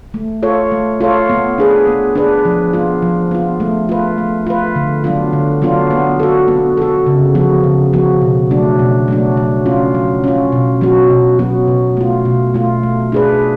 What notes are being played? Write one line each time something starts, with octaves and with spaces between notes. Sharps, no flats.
A3
F4 A4 C#5
A3
F4 A4 C#5
B3
D4 G#4 B4
B3
D4 G#4 B4
F3
B3 F4
F3
B3 F4
A3
F4 B4
A3
F4 B4
D3
F#3 B3 D4 F4
D3
F#3 B3 D4 F4
B3
F#4 A4
B3
F#4 A4
C#3
F3 B3 F#4
C#3
F3 B3 F#4
B2
F#3 A3 D4
B2
F#3 A3 D4
F#3
C#4 F4
F#3
C#4 F4
B2
F#3 B3 F#4
B2
F#3 B3 F#4
B2
A3 F4
B2
A3 F4
A3
D4 G#4 B4